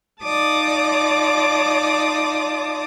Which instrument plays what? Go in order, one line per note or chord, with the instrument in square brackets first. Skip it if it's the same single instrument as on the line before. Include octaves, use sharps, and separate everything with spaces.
[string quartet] D#4 F4 D5 A5 D6 D#6